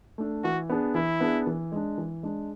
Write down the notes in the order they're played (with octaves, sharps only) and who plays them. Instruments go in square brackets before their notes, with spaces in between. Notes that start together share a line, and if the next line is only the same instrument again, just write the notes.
[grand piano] A3 D4
[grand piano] E3 [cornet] F#4
[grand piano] B3 D4 G#4
[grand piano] E3 [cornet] E4
[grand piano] B3 D4 G#4
E3
G#3 D4
E3
G#3 D4